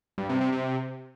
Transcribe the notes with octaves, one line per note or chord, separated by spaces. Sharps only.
G2
C3
C3
C3